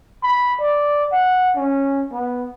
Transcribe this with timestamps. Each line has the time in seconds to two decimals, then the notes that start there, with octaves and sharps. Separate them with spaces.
0.23 B5
0.60 D5
1.12 F#5
1.56 C#4
2.12 B3